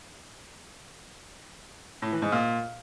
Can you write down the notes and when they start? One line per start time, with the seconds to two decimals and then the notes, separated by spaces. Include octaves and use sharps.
2.02 A2
2.12 E3
2.22 G#2
2.32 A#2